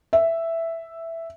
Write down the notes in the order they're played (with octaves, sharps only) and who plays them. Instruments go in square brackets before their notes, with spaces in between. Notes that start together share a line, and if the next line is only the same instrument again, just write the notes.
[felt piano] E5